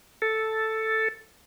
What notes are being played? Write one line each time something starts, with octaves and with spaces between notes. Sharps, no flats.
A4